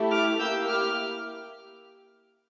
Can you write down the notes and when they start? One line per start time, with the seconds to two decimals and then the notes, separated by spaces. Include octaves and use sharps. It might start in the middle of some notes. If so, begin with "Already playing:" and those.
Already playing: A3 E4 G4
0.10 D6 F6
0.39 A#3 E4 G4 E6 G6
0.68 D6 F6